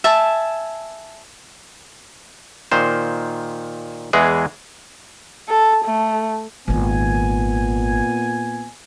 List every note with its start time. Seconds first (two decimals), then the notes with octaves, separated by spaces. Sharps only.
0.04 E5 G#5 A5
2.72 A#2 D#3 C5
4.13 E2 E3 G#3 G#4
5.48 A4
5.85 A3
6.68 G#1 A#2 D#3 B3 G#5